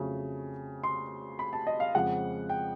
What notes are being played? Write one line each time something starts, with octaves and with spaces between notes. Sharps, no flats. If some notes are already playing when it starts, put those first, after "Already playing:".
Already playing: F2 C#3 F#3 A3
C6
B5
A5
D#5
F5
F2 C#3 F3 G#3 F#5
G5